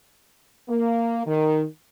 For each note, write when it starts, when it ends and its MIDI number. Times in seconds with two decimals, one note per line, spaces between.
0.69 1.25 58
1.26 1.64 51